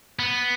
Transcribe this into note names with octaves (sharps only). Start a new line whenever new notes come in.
B3